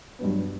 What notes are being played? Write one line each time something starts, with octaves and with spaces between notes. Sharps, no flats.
G2 F#3 B3